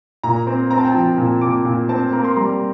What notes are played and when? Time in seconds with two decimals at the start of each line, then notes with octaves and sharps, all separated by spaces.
0.23 A#2 A#5
0.47 C4
0.71 C4 A#5
0.78 A5
0.85 G5
0.92 F3 A5
1.18 A#2
1.41 A#2 D6
1.65 A#2
1.89 C4 A5
2.12 A#3 A#5
2.24 C6
2.36 G3 A#5